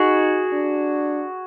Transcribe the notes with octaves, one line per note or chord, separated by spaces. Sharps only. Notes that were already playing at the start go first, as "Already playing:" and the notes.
Already playing: D#4 F#4 G#4
D4